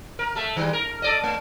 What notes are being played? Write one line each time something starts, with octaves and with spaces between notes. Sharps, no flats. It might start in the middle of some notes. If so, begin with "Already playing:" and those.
A#4
A3 A4 E5
D#3 G3 G#3
A#4
A4 D5 D#5
A3